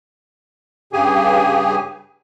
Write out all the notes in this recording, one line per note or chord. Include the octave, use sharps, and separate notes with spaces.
G2 C#3 G4 G#4 G#5